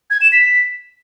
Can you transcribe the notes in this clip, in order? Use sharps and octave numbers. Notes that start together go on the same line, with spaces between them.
G#6
E7
B6